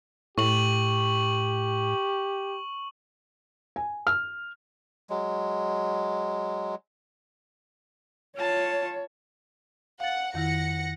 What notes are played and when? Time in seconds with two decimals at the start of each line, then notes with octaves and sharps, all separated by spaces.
0.38 A2 G4 C#6 F#7
3.76 G#5
4.07 F6
5.10 F#3 G#3
8.36 F4 C#5 A5
10.00 F5 F#5 A6
10.34 F2 D#3 E4 F#5 A#6 C#7